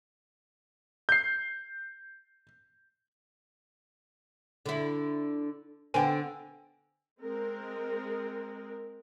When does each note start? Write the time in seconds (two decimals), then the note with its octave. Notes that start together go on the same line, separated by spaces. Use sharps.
1.09 G6 C7
4.66 D3 E4
5.94 D3 B3 C4 G5 G#5
7.21 G#3 C4 A#4